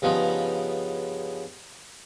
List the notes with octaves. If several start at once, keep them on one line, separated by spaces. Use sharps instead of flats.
G2 C#3 F3 B3 D#4